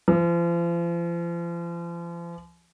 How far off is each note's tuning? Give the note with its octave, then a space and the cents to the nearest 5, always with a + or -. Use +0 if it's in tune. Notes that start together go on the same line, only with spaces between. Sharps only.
F3 -40